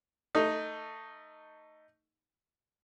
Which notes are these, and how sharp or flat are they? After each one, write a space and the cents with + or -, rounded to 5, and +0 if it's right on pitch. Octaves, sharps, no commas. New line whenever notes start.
A3 +20 D#4 +0